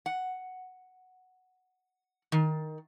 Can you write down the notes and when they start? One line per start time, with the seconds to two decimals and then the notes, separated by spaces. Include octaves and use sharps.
0.06 F#5
2.32 D#3